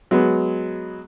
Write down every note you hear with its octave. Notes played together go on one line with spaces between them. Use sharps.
F#3 G#3 B3